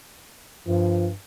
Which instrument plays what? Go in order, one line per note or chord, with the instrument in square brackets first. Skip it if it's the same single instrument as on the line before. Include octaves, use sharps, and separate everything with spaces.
[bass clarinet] G2 [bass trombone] F3